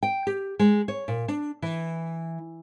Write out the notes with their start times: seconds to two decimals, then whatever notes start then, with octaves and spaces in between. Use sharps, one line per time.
0.03 G5
0.27 G4
0.59 G#3
0.88 C#5
1.08 A#2
1.28 D4
1.62 E3